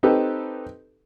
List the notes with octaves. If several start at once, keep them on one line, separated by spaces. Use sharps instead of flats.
C4 D#4 G4 A4 B4